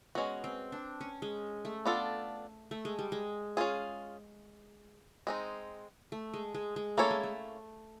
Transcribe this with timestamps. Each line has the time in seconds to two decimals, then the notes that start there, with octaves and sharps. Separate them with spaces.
0.15 G#3 B3 C#4 F#4
0.44 C4
0.72 D4
1.01 C#4
1.22 G#3
1.65 A3
1.86 B3 D4 F4 A4
2.71 A3
2.85 G#3
2.99 G3
3.12 G#3
3.57 C#4 F4 G#4
5.27 G#3 C4 D#4
6.12 A3
6.33 G#3
6.54 G#3
6.76 G#3
6.97 A3 A#3 C#4 E4 A4 C#5
7.10 G#3
7.23 A3